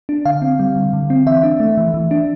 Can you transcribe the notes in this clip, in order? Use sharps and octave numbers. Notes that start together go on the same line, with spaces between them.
D4
D3 F5
C4
G3
D3
D3
C4
E3 E5
D4
A3
E3
E3
D4